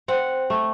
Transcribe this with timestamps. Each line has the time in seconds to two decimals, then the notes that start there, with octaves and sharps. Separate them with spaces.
0.08 C4 F#5
0.50 A3